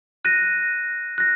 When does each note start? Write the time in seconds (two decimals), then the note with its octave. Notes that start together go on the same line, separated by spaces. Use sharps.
0.25 F#6 A#6 D#7
1.18 F#6 A#6